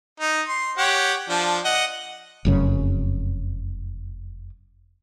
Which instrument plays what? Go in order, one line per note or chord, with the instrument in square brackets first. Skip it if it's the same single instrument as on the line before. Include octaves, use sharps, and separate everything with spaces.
[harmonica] D#4
C6
G4 C#5 F#5
F3 D4
D#5 F#5
[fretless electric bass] F1 F#2 C#3